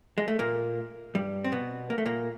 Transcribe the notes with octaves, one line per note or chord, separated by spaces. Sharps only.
G#3
A3
A#2 A#3
G2 G3
C4
B2 B3
A#3
A3
A#2 A#3